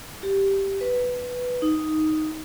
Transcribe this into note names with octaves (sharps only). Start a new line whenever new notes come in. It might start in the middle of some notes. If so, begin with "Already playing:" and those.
G4
B4
D#4